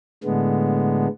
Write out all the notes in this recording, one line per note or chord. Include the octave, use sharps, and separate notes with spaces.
A2 D3 G#3 B3